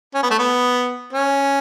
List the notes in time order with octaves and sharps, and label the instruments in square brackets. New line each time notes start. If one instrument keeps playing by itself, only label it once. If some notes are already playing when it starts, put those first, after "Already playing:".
[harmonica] C#4
B3
A3
B3
C#4